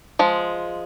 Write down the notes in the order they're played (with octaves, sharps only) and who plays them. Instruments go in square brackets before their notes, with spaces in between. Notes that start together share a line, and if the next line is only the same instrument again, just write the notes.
[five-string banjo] F3 G#3